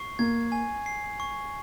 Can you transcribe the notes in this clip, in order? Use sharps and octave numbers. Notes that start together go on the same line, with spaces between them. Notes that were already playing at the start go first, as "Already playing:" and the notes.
Already playing: C#6 C7
A#3 G#6
G#5
C7
C#6